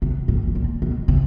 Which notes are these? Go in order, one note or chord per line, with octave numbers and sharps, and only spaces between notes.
C3
A#2
B2
A#2
B2
C3